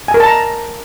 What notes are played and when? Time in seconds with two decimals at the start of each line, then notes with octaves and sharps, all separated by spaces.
0.08 G#5
0.14 A#4
0.20 A5
0.26 A#5